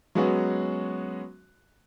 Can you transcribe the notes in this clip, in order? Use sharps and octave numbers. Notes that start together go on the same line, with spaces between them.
F#3 G#3 B3 C#4 F#4